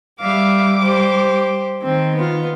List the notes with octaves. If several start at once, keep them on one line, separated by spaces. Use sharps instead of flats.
G3 E5 F5 D6
G4 C5
D#3 C4
B3 F4